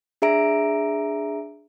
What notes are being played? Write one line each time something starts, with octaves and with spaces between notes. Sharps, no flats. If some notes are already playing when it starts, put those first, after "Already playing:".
D4 G#4 E5 A#5 D7